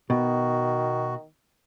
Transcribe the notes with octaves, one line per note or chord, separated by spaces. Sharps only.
B2 D#3 F#4